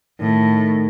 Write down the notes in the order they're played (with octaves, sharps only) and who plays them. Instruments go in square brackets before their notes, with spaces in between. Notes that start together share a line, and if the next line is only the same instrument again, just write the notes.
[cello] A2 [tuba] D#3